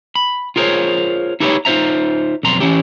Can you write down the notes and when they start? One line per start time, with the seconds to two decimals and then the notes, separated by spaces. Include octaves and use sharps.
0.15 B5
0.56 F4 G#4 A#4 C5 C#5
1.40 D#4 E4 G4 A#4 B4 C#5
1.65 D#4 F4 C5 E5 A#5
2.43 B1 F2 A#5 C6
2.60 E3 C#4 E4 G4